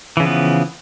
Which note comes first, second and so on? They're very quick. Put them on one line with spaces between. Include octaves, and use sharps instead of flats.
E3 C#3 F3 B3